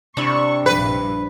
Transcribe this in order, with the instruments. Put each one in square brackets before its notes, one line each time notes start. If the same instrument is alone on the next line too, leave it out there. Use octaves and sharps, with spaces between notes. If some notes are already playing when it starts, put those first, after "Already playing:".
[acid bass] C3 [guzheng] D4 E4 [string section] C#6
[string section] A#1 G2 [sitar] B4